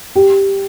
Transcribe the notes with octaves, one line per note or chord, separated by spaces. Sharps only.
G4